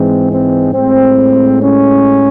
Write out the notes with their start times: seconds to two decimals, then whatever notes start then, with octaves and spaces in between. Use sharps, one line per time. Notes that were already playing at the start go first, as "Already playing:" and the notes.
Already playing: G#2 E3 G#3 C4
0.31 C4
0.74 A2 G#3 C4
1.61 C#4